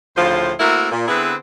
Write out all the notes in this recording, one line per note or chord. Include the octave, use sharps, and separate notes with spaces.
D2 A2 C#3 F3 F4 C5
A3 A#3 C4 E4 F#4 A#4
A#2
D3 B3 C4 E4 G#4 B4